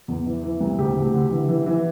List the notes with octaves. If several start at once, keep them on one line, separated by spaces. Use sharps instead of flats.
E2
E3
E3
C2
D2 G4
D2
D3
E3
E3
E3